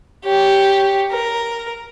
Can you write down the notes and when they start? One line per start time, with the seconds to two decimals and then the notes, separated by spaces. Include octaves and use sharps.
0.25 G4 C#5
1.11 A#4